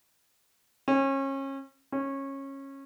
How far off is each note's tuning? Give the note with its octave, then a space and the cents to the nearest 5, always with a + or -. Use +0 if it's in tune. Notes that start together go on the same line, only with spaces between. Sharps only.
C#4 -30
C#4 -20